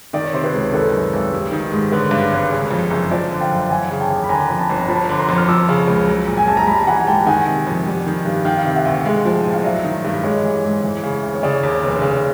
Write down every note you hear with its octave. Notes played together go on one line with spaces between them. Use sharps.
D#3 D5
C#5
C3 C5
B4 C#5
C#2
D#3 A4 B4
F#2
G#1
G3
D#3
G#2
D3 B4 C#5
G2
G#1
C#3
F2
F#1
F3 C5 D5
D3
F5 G5
F#2
E3 F#5 G#5
C#3
G5 A5
D#2
B5
D3 G#5 A#5
F2
A5 B5
G1
A#5
F3 A5 B5
D3
A#5 C6
F2
F6
F3 D6 E6
C#3
C#2
F#3
A#2
G#5
A#1 A5
A#5
G3 A5 B5
E3 F#5 G#5
G#2 G5 A5
D#3 F#5 G#5
C3
F2
G3
D#3
G2
D#3 F5 G5
C3
E5 F#5
D2
G#3 D#5 F5
F3
A2
F5
F#3 D5 E5
D#3
G2
G#3 C#5 D#5
E3
G#2
E3
C#3
D2
C#5
C#3 C5 D5
D#2
F1
C#3